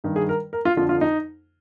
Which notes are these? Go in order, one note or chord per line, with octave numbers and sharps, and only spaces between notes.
G2 D#3
G#4
A#4
A#4
F4
F2 D3 F3 F4
F4
D#4